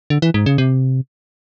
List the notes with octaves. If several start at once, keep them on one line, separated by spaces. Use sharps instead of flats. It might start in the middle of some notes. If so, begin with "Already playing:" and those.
D3
E3
G#2
C#3
C3